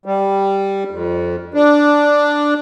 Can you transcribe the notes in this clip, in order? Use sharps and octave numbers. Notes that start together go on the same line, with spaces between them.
G3
F2
D4